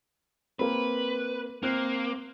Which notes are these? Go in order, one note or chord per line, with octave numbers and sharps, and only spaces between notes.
A#3 C4 B4
A#3 C4 F#6